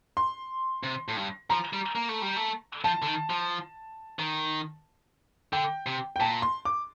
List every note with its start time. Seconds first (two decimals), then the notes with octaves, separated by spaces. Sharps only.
0.17 C6
0.83 C3
1.08 A2
1.17 G2
1.50 F3 A#5
1.73 G3
1.95 A#3
2.09 A3
2.22 G3
2.36 A3
2.84 F3 A5
3.02 D3
3.07 D#3
3.30 F3
4.19 D#3
5.53 D3 G5
5.86 C3
6.16 G5
6.20 A#2 A5
6.42 C6
6.65 D6